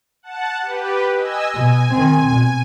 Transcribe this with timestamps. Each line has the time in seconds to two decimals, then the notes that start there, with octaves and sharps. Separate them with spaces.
0.23 F#5 A5
0.62 G4 B4
1.16 D#5 G#5 E6
1.54 B2 G#5
1.93 D#3 C4
2.26 B2